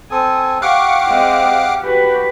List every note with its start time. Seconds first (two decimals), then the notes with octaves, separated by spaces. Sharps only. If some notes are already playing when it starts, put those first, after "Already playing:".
0.11 C4 A4 G#5 D#6
0.62 G4 F5 F#5 C#6 D6
1.08 G#3 C4
1.82 F#4 G4 B4